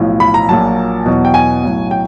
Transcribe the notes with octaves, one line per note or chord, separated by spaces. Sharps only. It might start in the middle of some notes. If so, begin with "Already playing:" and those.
Already playing: B1 A2 F3
B5
A#5
A#1 A#2 F#3 A5
E2 B2 F#3
G5
G#5
B1 A2 F#3
G5